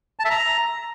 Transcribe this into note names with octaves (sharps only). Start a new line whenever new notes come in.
A5
E5
A#5